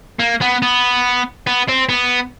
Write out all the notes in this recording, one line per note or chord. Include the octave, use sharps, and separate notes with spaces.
A#3
B3
B3
B3
C4
B3